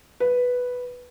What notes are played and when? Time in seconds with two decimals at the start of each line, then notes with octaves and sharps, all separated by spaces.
0.20 B4